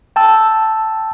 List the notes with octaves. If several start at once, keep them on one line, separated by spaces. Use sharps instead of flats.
G5 A5 E6